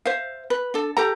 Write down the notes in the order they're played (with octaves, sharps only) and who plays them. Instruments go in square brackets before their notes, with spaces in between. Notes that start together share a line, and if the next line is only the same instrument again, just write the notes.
[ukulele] C5 E5 F5
B4
D4 A4
G4 A4 A#5